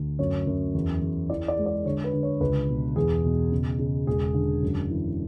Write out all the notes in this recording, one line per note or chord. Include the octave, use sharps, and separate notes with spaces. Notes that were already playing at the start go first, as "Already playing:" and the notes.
Already playing: D2
F#2 C#5
F#2
E2
E2
E3 D5
D5
G#3
D5
D3 C#5
B4
D3
C#5
C#2 B4
B2
E2 G#4
B2
C#3
C#3
E1 G#4
D3
F#2
E3